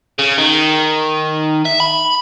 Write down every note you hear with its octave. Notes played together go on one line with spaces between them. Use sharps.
C#3
D#3
E5
B5